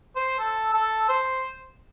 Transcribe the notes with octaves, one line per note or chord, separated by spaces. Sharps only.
C5
A4
A4
C5